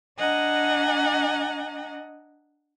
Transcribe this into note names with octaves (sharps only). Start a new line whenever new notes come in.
D4 D#5 F#5 G#5 A#5